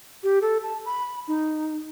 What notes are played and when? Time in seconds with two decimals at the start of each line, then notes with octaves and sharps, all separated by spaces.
0.23 G4
0.42 A4
0.63 A5
0.86 B5
1.28 D#4